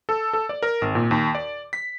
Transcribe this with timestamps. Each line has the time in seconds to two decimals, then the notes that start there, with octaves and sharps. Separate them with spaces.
0.09 A4
0.33 A4
0.49 D5
0.63 A#4
0.82 G#1
0.95 A#2
1.11 D#2
1.35 D5
1.73 B6